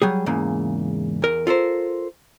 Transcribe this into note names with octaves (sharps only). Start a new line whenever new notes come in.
F#3 G3 G#4
E2 G#2 C#3 A#3
E2 A#4
F4 A4 A#4 C5